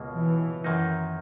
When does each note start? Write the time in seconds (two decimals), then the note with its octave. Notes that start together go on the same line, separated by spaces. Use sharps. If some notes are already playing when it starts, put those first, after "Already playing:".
Already playing: C#2 B2 A#3
0.15 E3
0.64 F#2 D#3 A#3 D#4